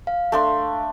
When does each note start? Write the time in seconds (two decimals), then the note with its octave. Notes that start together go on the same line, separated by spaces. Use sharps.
0.07 F5
0.32 A3 D4 C6